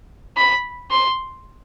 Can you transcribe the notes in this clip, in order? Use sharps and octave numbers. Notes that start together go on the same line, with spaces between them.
B5
C6